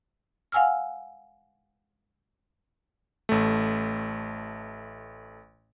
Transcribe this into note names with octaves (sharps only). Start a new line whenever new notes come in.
F5 F#5 G#5 E6 F6
A1 A3